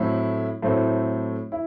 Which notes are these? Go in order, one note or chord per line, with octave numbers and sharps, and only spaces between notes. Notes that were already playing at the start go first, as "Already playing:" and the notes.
Already playing: A2 F#3 A3 C4 E4
A2 F#3 A3 C4 E4
E4